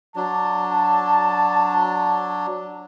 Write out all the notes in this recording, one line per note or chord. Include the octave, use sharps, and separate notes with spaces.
F#3 D4 A5